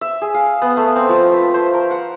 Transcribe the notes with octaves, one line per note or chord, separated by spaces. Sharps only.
E5
G#4
F5
B3
A3
C4
F3
B4
C5
A#4
F#5